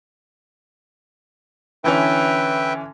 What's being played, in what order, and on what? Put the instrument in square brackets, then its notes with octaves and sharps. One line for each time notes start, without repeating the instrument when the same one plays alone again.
[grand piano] D3 E3 C#4 [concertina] B4 E5 G5